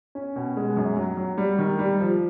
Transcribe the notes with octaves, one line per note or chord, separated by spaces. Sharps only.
C#4
B2
G#3
F#2
F#3
F#3
G3
D#3
G3
F3